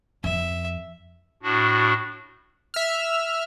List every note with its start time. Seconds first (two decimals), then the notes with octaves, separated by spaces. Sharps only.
0.24 F2 E5
1.43 A2 D4 F#4
2.74 E5 F6